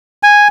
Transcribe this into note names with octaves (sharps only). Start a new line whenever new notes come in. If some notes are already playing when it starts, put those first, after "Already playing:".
G#5